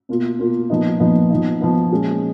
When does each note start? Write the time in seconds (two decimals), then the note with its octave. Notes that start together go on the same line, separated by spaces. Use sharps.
0.09 B2 A#3 F4
0.39 B2 A#3 F4
0.70 A#2 F3 B3 D#4
0.99 A#2 F3 B3 D#4
1.30 F3 B3 D#4
1.60 F3 B3 D#4
1.92 A#2 G#3 C#4